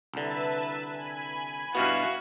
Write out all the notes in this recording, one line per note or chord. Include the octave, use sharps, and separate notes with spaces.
C2 D3 B4 E5 A5
G#5 B5
G2 B2 B3 E4 F#4 F5